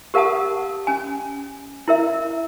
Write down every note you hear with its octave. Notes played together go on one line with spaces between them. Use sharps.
G4 A#4 F5 F#5 A5 D#6
C#4 G#5
E4 A#4 E5